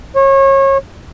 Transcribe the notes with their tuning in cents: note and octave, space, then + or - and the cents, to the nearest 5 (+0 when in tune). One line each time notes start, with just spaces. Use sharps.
C#5 -30